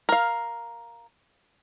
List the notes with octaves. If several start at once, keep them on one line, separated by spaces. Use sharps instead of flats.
A#4 F5